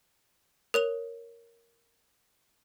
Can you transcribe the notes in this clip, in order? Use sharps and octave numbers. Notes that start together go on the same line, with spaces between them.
A#4 C#5 F7